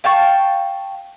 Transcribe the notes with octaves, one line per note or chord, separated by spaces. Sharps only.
F5 G5 A5 C#6